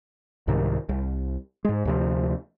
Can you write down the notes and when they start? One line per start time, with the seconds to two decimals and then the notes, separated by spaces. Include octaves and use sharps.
0.47 C2 G#2 C3 D#3
0.89 C2
1.65 G#2 G#3
1.85 D2 C3 F3